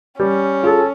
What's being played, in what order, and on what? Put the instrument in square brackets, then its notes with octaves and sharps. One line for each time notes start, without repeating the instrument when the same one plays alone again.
[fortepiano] G3 [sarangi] C#4
[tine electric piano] F4 G#4 [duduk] A4